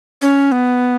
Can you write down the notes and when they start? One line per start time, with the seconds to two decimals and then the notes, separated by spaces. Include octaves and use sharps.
0.22 C#4
0.52 B3